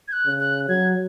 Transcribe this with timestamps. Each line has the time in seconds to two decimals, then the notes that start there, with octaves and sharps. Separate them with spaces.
0.08 G#6
0.12 F#6
0.26 C#3
0.40 F#6
0.68 F#3 G#6